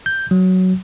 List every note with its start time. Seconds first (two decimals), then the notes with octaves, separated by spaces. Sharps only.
0.06 G6
0.31 F#3